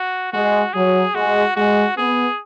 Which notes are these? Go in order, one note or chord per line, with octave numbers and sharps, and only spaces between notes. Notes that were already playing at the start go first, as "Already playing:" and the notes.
Already playing: F#4
G#3 F#4
F#3 G#4
G#3 F#4
G#3 F#4
B3 G#4